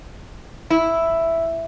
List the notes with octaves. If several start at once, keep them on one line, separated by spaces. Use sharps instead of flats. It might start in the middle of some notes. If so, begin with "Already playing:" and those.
E4